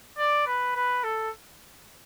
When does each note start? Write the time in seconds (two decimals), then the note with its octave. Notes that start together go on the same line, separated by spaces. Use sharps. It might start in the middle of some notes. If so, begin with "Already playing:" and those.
0.18 D5
0.47 B4
0.76 B4
1.04 A4